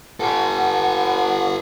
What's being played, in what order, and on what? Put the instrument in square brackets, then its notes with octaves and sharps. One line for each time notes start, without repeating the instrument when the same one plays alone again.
[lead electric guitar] G4 A4 [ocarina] F#5